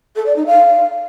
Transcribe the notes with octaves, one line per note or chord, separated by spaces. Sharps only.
A4
D5
D#4
F5